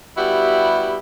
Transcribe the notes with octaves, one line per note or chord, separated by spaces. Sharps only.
G3 B3 E4 F#4 G4 E5